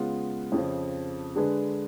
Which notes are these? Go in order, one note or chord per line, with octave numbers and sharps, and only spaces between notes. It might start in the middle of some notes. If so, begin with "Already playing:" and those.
Already playing: C#3 G#3 B3 F4
F2 C#3 F3
D3 G#3 D4 G#4 B4